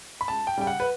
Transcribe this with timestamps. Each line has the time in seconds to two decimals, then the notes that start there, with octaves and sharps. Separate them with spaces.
0.21 B5
0.28 C#2 A5
0.47 G5
0.58 C#3 G3 G5
0.67 F#5
0.80 B4